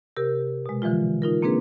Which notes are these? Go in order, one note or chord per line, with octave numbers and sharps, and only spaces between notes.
C3 G4 A#4
B2 G#3
D3 E3 F3 G#3 F4
D#4 F4 A#4
A#3 C4 D4 G#4 B4